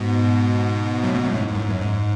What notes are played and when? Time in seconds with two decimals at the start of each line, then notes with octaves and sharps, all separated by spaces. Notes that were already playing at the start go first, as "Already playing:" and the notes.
Already playing: G#2 B2
1.03 F#2 A2
1.15 G#2 B2
1.26 F#2 A2
1.36 G#2
1.48 G#2
1.55 F#2
1.59 G#2
1.71 F#2
1.82 G#2